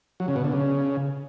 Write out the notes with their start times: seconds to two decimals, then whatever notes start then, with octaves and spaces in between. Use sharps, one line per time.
0.20 F#3
0.28 C#3
0.36 B2
0.44 D3
0.52 C#3